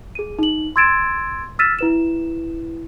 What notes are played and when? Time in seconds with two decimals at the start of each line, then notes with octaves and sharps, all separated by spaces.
0.15 G#4 D#7
0.39 D#4 F#7
0.76 C6 E6 G#6 A6 D7 E7
1.59 E6 F6 A6 B6 D#7 E7
1.79 E4 B4 E7